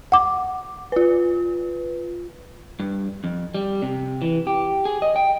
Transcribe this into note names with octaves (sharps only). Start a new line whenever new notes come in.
F#5 D6
F4 B4
G2
F2
G3
C3
E3
G4
G#4
D#5
G5